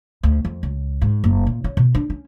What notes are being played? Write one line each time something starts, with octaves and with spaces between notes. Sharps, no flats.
D2
F2
C#2
G#2
F#1
A#2
C#4
B2
D4
C#4